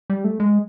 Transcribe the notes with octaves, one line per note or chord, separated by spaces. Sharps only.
G3
A3
G#3